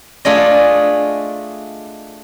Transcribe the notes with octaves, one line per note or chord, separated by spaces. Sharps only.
A3 D4 F4 G#4 D5 D#5